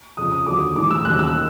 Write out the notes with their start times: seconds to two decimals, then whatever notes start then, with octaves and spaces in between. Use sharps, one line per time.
0.17 F2 C#3 F3 D#6
0.32 D#6
0.46 D#2 D3 F#3 D6
0.75 A2 E3 G3 D6
0.91 E6
1.05 D#2 C#3 F#3 F#6
1.19 E6
1.35 D#3